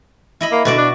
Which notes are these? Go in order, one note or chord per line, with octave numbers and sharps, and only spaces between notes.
E4 D#5 B5
A#3
B2 D3 F#4 D5
D4